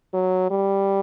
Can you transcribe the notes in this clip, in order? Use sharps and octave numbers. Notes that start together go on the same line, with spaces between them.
F#3
G3